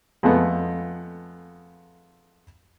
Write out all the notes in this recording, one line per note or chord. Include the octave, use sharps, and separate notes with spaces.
F2 G#3 A3 B3